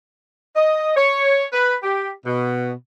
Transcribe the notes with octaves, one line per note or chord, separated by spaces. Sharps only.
D#5
C#5
B4
G4
B2